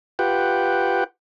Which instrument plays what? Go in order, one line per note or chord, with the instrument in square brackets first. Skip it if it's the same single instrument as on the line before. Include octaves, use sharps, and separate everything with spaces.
[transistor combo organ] F4 G4 B4 F#5 G5